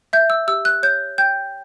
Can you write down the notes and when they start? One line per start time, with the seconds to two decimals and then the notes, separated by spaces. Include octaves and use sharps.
0.13 E5 G6
0.30 E6
0.47 G4 E6
0.65 F#6
0.83 C#5 G6
1.18 G5 G6